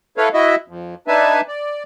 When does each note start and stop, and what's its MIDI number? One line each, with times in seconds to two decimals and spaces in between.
0.18 0.29 64
0.18 0.29 69
0.18 0.29 71
0.18 0.29 73
0.18 0.29 77
0.34 0.55 64
0.34 0.55 66
0.34 0.55 75
0.34 0.55 76
0.68 0.95 41
1.08 1.41 62
1.08 1.41 63
1.08 1.41 71
1.08 1.41 76
1.08 1.41 80
1.08 1.41 81
1.48 1.83 74